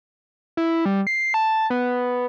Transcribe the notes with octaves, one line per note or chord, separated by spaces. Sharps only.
E4
G3
C7
A5
B3